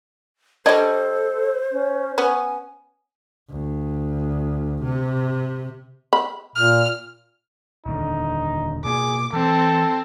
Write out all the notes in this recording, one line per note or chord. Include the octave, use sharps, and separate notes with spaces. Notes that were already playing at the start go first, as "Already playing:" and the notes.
G3 D4 A4 C5 C#5 D#5
C#4
B3 C#4 G#5
D2
C3
B5
A#2 F6
D#1 D#2 D3 D#4
B2 A#3 G#4 D6
E3 C4 A4